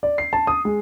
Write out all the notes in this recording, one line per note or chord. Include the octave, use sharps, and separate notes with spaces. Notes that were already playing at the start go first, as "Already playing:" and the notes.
D5
C7
A5
D#6
G#3